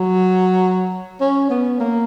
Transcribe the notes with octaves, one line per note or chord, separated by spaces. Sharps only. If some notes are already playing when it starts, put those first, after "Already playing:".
Already playing: F#3
C#4
B3
A#3